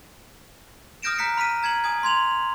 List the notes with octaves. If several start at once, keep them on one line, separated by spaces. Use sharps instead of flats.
D#6 F6 G6 A#6 D7 E7
A#5 F#6 B6 C#7
B5 F6 B6 D#7
A#5 G#6 C#7 F#7
G#5 D#6 G#6
C6 G#6 F7 F#7